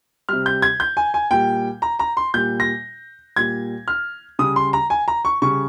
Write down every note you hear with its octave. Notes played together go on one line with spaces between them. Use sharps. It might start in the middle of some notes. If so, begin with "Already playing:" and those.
C3 G3 F6
G6
G#6
G6
G#5
G#5
A#2 G3 G5
A#5
A#5
C6
A#2 G3 G6
A#6
A#2 G3 G#6
F6
C#3 G3 D#6
C6
A#5
G#5
A#5
C#6
C#3 G3 C#6